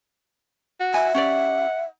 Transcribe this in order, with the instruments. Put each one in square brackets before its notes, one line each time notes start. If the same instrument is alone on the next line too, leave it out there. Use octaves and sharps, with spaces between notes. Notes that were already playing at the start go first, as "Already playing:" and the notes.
[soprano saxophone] F#4
[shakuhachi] E5 [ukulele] G#5
[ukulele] C#4 G4 D5 [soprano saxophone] F#5